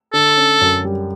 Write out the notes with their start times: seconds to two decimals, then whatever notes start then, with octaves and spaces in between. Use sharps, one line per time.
0.13 D3 A4
0.37 C#4
0.61 F#2
0.85 G3